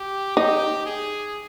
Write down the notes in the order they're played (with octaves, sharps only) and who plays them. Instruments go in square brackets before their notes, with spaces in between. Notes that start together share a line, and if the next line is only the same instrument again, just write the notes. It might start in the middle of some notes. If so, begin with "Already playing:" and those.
Already playing: [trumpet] G4
[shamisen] D#4 [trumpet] G4
[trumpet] G#4